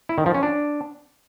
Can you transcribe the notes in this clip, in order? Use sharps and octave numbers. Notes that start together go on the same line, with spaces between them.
E4
D#3
F3
C#4
D4